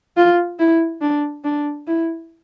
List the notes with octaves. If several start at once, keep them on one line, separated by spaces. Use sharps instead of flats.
F4
E4
D4
D4
E4